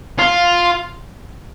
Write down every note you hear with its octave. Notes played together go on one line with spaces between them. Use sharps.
F4